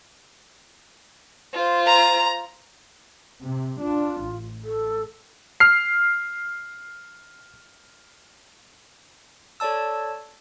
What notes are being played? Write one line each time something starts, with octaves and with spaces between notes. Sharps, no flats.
F4 C5
A#5
C3
D4 F4
A1
A4
F6 C7
A4 C#5 D5 A5 E6